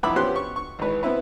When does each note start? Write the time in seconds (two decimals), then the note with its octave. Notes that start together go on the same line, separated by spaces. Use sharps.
0.03 B1 F2 E3 E5 B5 D6
0.16 F3 B3 C#4 G4 C6 F#6
0.36 C#6
0.56 C#6
0.79 G#1 E3 B4
1.03 B3 C4 E4 B4